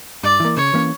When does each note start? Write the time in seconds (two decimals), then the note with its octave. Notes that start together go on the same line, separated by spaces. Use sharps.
0.23 G2 D5
0.40 E3 A#3
0.57 C#3 C#5
0.73 E3 A#3 C#4